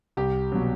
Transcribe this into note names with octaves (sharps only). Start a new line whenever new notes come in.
C2 G4
B2 F#3